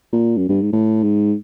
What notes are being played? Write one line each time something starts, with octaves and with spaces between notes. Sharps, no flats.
A#2
F#2
G2
G#2
A2
G#2